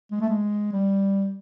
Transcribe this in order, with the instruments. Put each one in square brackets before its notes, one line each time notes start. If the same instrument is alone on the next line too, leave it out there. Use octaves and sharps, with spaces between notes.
[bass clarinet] G#3
A3
G#3
G3